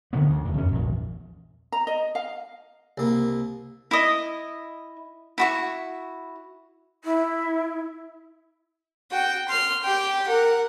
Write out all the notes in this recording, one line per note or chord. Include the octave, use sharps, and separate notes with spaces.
D3 D#3 F3 B3
D2
E2 D3
F#2 C#4
A#1 E2
A#5
D#5
F5
C2 A#3
E4 D#5
E4 F#4 C#6
E4
F#4 G5
C6 F6
G4 G5
A#4 F#5